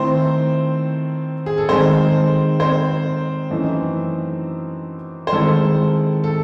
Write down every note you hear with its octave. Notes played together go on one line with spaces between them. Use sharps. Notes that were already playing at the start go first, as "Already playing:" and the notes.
Already playing: D#3 A3 C4 E4 C5
G#4
A4
D#3 G#3 C4 D#4 C5
C4 C5
F#2 E3 A3 D#4
C5
D#3 G#3 C4 E4 A4
A4